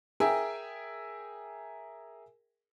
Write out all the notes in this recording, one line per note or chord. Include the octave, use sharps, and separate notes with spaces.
G#4 A#4 E5 G5 G#5